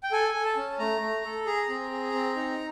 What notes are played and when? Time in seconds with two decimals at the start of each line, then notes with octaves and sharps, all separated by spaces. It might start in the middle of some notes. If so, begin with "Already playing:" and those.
0.03 G5
0.12 A4 G#5
0.34 A4
0.45 A5
0.57 C#4
0.79 A3 A#5
1.01 A3
1.24 A4
1.46 G#4 A#5
1.69 C4
1.91 G#4
2.13 C4
2.36 D#4